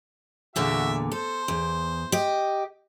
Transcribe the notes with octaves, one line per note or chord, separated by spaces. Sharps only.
E2 A#2 D3 F#4 E5
A4 C5
E2
G4 D#5